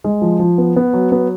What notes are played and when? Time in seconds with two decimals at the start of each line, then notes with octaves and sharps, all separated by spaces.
0.04 G#3
0.22 F3
0.39 F3
0.58 B3
0.76 B3
0.93 F#3
1.12 B3